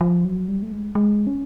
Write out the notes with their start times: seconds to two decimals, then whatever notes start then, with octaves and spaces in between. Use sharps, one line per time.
0.01 F3
0.25 F#3
0.48 G3
0.63 A3
0.72 G#3
0.95 G#3
1.27 C#4